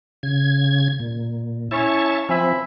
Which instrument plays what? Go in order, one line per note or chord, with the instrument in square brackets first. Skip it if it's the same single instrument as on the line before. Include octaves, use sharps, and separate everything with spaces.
[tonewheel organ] C#3 G#6
A#2
[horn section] C#4 E4 C#5 [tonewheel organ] E5 A5
[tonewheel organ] F3 C4 [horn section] E5 G#5 B5